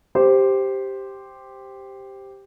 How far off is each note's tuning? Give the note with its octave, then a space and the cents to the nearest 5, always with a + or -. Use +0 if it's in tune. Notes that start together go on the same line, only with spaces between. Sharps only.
G4 +0 C5 +0